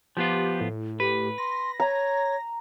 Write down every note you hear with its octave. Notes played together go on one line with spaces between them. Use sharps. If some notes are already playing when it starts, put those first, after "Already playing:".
F3 B3 F4 G4
A2
G4 B4
C6 A#6
C#5 A#5